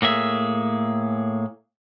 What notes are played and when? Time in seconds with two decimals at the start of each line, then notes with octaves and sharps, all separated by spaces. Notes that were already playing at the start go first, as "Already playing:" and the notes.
0.02 A2 A#3 G#4 E5